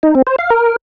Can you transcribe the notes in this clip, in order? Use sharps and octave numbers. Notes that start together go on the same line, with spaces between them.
D#4
C4
C5
F5
A#4